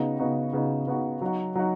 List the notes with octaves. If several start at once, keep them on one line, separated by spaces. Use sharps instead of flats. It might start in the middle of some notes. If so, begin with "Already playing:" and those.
Already playing: C#3 B3 D#4 F#4
C#3 B3 D#4 F#4
C#3 B3 D#4 F#4
C#3 B3 D#4 F#4
F#3 D#4 F#4
F#3 D#4 F#4